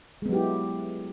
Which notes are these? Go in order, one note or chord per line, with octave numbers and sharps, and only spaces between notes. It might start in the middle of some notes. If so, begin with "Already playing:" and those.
F#3 G#3 B3 E4 G4